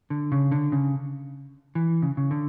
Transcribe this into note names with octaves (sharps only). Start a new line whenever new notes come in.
D3
C#3
D3
C#3
E3
C#3
C#3
D3